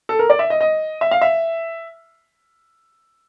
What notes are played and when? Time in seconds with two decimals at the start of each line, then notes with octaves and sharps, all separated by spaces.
0.09 A4
0.19 A#4
0.30 D5
0.39 E5
0.50 D#5
0.61 D#5
1.01 E5
1.11 F5
1.21 E5